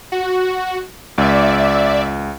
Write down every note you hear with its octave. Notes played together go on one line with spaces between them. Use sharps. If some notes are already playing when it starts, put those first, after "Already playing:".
F#4
C#2 D5 E5